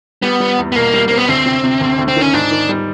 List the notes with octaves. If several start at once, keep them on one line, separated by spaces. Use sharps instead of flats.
G3 B3
G3
E2
B3
B2 A#3
G3
A#3 C4
B3
D2 C4
C3
C3
D2
D2
C4
D#3 C#4
G#2 D4
D#3
G3